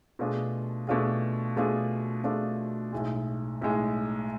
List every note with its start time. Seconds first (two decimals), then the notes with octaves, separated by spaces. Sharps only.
0.19 B2 A3 D4 F4 G#4
0.87 B2 A3 D4 F4 G#4
1.57 B2 A3 D4 F4 G#4
2.24 B2 A3 D4 F4 G#4
2.93 B1 A2 G#3
3.61 B1 A2 G#3